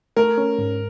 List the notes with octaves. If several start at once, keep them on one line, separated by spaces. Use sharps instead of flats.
A3 A#4
C#4
G#2